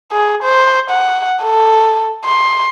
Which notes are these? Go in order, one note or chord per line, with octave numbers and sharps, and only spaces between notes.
G#4
C5
F#5
A4
C6